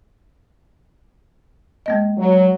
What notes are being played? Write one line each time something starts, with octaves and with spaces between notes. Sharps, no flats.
G#3 A#3 D#5
F#3